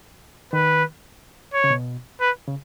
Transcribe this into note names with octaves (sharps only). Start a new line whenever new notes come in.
D#3 B4
C#5
C#3
B2
B4
C#3